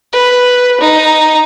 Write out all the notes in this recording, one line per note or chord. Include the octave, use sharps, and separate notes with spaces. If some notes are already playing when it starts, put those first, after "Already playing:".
B4
D#4